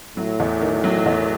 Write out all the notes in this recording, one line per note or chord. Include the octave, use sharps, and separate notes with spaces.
A2 F#3
E2
D#3
F#3
E2